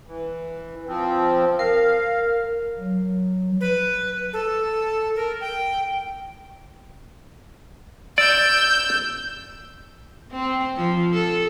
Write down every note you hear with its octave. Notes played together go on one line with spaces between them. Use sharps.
E3
F3 C4
A#4 F5
F#3
B4
A4
A#4
G5
D5 E6 G6
C4
F3
A4